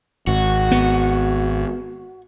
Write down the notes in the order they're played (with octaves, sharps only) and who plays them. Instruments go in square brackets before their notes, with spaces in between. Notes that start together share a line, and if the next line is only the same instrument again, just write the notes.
[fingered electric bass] G#1 [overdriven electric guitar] F#4
[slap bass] B3